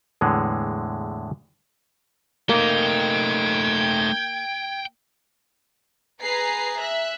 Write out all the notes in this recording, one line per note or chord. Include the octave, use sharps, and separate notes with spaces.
E2 A2 D3 G#3
A3 A#3 D#4 G5 G#6
G#4 B4 A#5 C7
E5 F#6